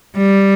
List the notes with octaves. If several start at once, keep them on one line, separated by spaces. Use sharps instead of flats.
G3